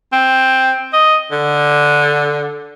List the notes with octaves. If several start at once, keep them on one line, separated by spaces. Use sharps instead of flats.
C4
D#5
D3